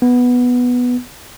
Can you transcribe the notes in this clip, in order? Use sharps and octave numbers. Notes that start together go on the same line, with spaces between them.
B3